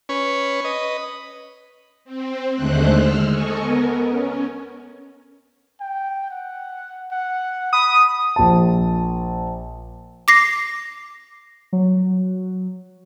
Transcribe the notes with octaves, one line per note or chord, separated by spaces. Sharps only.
C#4 B4 C#5
B4 D#5
C4
D#2 D3 G#3 A3 C5 F#6
E6 F6
A4 D#5 G#5 C#6
B3 A#4
C#4
G5
F#5
F#5
B5 D#6
A#1 A5
D6 A#6 C7
F#3